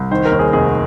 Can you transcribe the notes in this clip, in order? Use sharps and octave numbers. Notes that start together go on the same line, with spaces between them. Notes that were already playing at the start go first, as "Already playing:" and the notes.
Already playing: C2
D#3 C5
A#4
D#2
G#4
F1 G#4